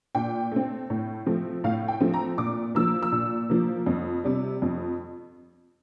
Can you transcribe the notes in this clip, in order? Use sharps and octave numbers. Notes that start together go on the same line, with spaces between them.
A#2 G5
A3 C4
A2
F3 A3 C4
A2 F5
G5
F3 A3 C4
A#5
A#2 D6
F3 A#3 E6
E6
A#2
F3 A#3
F2
C3 G3
F2